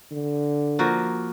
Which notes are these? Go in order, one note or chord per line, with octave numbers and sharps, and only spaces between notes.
D3
F3 A#3 F#4